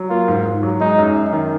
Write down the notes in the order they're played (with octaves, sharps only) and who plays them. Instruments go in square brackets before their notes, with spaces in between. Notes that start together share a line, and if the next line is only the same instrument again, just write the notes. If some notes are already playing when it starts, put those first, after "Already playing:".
Already playing: [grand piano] F#3
[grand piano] A#3 [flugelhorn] F4
[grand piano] G#2
G#2
F#3
[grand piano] G#3 [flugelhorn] D#4
[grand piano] F#2
F#2
D#3